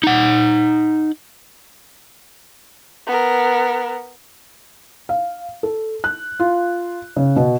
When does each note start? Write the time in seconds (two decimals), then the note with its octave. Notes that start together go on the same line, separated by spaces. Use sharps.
0.03 D#4 F#5
3.07 B3 A#4
5.09 F5
5.63 A4
6.04 F#6
6.40 F4
7.16 C#3
7.36 B2